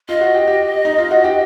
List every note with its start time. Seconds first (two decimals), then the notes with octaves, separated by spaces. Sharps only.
0.09 F4 D#5
0.21 F#4
0.35 G4
0.47 G4
0.85 D#4
0.98 F4
1.11 F#4
1.24 G4